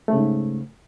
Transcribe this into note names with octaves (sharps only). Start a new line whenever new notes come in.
G#2 C#3 A3